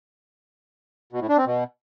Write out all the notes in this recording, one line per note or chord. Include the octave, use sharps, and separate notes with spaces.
B2
A2
D4
C4
B2